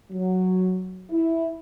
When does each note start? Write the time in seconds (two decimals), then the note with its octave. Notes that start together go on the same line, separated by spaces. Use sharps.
0.12 F#3
1.10 E4